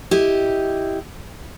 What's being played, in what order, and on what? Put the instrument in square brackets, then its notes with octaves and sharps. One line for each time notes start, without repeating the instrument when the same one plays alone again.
[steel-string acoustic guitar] E4 G4 D#5